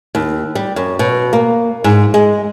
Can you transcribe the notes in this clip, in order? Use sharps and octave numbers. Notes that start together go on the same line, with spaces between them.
D#2
G3
F#2
B2
A#3
G#2
G#3